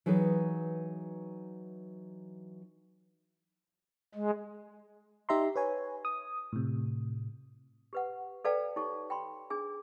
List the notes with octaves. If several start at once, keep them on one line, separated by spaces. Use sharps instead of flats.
E3 F#3 D#4 G#4 B4
G#3
D#4 G4 E5 A#5 C6
B4 C#5 G#5
D#6
A2 C3
G4 B4 F#5
A4 B4 D5 F5 G5 A5
D#4 G4 A4 C#5 C#6
G5 B5 C6
D4 G#4 G#5